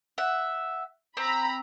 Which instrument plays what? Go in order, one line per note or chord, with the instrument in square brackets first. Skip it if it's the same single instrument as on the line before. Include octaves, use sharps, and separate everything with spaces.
[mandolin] E5 F#5
[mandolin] C4 [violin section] A#5 B5